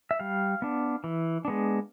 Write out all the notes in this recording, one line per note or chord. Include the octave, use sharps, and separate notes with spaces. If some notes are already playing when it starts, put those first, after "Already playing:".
E5
G3 F5
B3 D4
E3
G#3 B3 D4